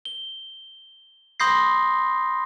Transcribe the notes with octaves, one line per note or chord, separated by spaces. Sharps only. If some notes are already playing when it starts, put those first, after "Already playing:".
G7
B5 C6 D#6 G6 A#6 C7